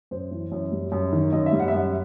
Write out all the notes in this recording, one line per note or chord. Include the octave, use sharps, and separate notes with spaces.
F#2 C5
E3
F#2
G3
F#2
D#3
F#2 D#5
E5
G3
F#5
E5
F#2 F#5